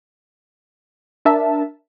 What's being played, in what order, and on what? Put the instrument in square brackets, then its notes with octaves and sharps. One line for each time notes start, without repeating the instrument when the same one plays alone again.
[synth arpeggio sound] D4 A#4 E5 A5